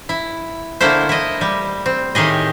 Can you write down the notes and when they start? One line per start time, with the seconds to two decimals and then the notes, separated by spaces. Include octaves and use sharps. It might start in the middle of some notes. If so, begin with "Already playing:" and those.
0.09 E4
0.81 D3 A3 A#3 E4 C5
1.09 E4 D#5
1.41 G3
1.86 C4
2.15 A2 D#3 G4 G#4 D#5